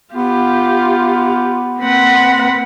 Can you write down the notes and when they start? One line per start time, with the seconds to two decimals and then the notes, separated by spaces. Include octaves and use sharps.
0.14 B3 F4 G4
1.80 A#3 C4 B4 F#5